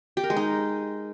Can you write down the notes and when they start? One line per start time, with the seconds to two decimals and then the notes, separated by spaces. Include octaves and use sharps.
0.17 G4
0.23 A#4
0.30 G#3
0.36 D#4